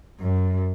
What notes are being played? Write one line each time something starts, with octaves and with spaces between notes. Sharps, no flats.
F#2